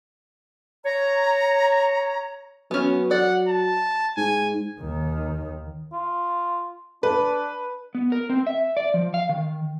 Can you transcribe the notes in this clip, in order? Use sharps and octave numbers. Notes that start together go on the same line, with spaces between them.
C#5 A#5
F#3 B3 C#4
D5 F#5
A5
G#2 G#5
D#2 D#3
F4
D4 B4
B3
A#4
C4
E5
D5
F3
F5
D#3